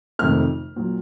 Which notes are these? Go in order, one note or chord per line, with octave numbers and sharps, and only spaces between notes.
F2 C3 D#3 A3 F6
A#2 F#3